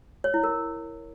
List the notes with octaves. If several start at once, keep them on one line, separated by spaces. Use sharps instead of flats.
C#5
E4
A#4